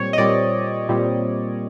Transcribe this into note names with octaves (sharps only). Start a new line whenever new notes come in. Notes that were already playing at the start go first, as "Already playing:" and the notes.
Already playing: A#2 G3 C4 C#5
D#5
A#2 G3 C4 D5
A#2 G3 C4